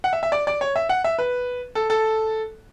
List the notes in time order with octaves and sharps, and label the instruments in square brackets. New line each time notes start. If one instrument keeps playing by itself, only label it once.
[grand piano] F#5
E5
E5
D5
D5
C#5
E5
F#5
E5
B4
A4
A4